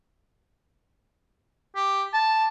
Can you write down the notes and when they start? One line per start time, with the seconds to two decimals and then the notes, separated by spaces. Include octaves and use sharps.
1.76 G4
2.14 A5